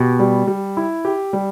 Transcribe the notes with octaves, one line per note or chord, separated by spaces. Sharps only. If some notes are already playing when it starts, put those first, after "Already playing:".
Already playing: B2 G4
G3
G3
E4
G4
G3